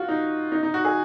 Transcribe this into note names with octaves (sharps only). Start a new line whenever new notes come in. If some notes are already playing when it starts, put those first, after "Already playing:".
Already playing: F4 F#4
D#4
D#4
D#4
F#4
G#4